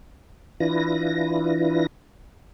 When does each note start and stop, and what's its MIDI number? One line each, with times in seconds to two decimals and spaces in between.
0.60 1.86 52
0.60 1.86 62
0.60 1.86 64
0.60 1.86 65
0.60 1.86 71
0.60 1.86 94